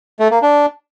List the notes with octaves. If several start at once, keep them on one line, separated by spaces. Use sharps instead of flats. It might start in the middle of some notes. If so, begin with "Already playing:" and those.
A3
A#3
D4